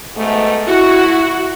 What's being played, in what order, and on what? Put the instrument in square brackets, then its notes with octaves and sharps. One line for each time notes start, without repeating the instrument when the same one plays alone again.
[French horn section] G#2 B2 A3
[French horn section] E4 [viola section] F#4